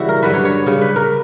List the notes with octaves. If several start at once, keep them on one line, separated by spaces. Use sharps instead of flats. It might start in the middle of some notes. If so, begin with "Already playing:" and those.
Already playing: C#3 E3 G3 E4 F#4
A#4
G2 D3 F#3 B4
C#5
C#5
C#3 G3
B4
A#4